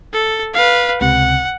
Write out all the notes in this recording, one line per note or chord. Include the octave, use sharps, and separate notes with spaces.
A4
B4 F5
C#2 C3 F#5